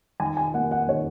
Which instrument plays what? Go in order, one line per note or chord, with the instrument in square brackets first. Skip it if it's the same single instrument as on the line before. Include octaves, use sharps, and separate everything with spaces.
[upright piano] D#3 G#5
G#5
A#3 F#5
F#5
D#3 C#5